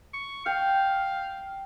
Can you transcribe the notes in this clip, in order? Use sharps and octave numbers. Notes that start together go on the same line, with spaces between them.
C#6
F5 G5